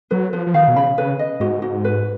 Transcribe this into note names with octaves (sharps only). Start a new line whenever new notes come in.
F#3 B4
F3 B4
F3
D#3 F5
B2
C#3 B5
C#3 B4
D#5
G#2 F#4
F#4
B4